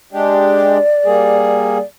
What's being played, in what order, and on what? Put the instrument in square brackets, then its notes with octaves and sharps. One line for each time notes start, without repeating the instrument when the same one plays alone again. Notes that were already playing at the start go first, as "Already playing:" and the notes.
[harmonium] G#3 D4 G4 [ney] D5
[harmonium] G3 A#3 G#4